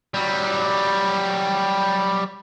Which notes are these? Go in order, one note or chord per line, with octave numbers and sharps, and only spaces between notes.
F#3 G3